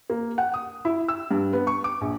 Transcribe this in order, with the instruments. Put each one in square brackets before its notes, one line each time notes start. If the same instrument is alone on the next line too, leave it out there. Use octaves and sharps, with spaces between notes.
[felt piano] A#3
F#5
D#6
E4
E6
G2
B3
C#6
D6
A#1